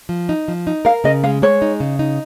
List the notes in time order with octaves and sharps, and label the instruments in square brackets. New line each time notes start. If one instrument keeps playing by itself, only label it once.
[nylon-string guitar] F3
D#4
F3
D#4
[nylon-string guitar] A#4 [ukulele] F5
[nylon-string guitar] C#3 [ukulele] D#5
[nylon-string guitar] G#3 [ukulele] F5
[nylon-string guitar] G#3 [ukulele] C#5
[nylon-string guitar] D#4
C#3
D#4